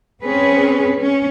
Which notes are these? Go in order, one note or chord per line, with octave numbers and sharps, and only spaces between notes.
C4 C#4 G#4 B4
C#4